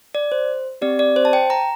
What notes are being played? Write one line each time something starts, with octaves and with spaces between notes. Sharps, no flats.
D5
C5
C4 G4 D5
D5
C5
A5
G5
A#5